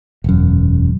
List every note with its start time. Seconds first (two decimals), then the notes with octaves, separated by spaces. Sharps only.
0.24 E1 F#2